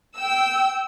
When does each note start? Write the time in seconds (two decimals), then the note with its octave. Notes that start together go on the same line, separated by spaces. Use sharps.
0.15 G5 E6